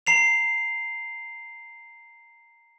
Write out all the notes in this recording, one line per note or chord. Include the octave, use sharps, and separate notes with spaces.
A#5 C7 F7